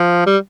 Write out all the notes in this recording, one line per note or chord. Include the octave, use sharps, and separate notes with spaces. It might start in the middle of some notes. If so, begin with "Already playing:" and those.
Already playing: F3
G3